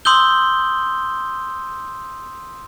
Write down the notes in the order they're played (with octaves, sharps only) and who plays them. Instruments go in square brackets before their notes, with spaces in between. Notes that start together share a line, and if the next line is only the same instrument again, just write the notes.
[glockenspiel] C6 D#6 E6 G6 G7